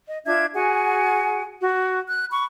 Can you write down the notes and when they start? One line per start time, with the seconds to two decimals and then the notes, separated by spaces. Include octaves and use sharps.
0.07 D#5
0.26 D4 F4 E5 G#6
0.54 F#4 G#4 F#5 G#5
1.60 F#4
2.07 F#6
2.31 B5 C#6